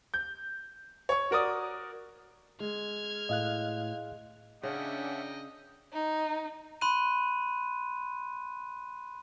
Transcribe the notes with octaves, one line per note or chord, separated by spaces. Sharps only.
G6
C#5 C#6
F#4 A#4 D5 D#6
G#3 F6 G#6
A2 D#5 F5 F#6
C#3 C#4 D4 D#5 E5 F#5 G5
D#4
B5 C6 F#6 D#7